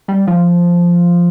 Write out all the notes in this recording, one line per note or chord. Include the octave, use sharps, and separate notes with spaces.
G3
F3